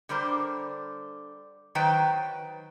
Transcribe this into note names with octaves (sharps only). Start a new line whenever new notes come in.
D3 G3 A#4 C5
D#3 F#3 B4 C5 G5